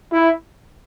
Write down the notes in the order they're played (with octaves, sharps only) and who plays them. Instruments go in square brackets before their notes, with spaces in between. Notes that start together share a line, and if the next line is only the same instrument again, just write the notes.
[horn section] E4